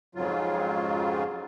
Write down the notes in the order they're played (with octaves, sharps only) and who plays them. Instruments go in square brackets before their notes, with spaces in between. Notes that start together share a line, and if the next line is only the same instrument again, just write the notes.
[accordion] F2 G#2 C#3 F#3 F4